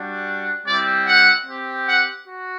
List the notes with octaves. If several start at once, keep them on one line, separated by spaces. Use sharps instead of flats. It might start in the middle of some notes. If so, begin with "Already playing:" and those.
Already playing: G3 D4 F#4
G3 C4 E4 D5
F#5
C4 G4
F#5
F#4